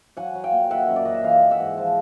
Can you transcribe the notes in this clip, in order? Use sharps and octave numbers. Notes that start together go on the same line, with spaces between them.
F#3 F#5 G#5
F#3
F5 G5
A#2
D#3 E5 F#5
F#2
D5
F#2 D#5
E5
E3 D#5 F5
E3
E5 F#5
G#2
F3